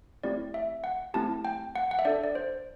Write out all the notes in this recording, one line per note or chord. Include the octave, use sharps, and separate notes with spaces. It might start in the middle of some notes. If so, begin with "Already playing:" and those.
A3 C4 E4 G4 D5
E5
F#5
A3 C4 E4 G4 A5
G5
F#5
F#5
E5
D4 A4 D5
D5
C5